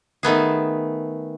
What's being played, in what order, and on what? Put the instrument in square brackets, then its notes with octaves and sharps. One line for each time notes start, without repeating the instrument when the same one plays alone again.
[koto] D#3 A3 B3 G#4